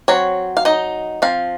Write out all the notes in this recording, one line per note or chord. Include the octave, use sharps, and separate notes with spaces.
F#3 C4 C#5
F5
D#4 D#5
F3 C4 F5